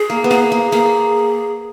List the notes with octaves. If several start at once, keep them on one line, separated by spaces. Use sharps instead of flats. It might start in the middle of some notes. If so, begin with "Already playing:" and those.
Already playing: G#4
A#3
B3
A#3 G#4
A#3
A#3 G#4